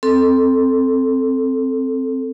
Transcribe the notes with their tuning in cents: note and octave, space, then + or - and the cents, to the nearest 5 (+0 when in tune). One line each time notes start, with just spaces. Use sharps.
C4 +0 A4 +0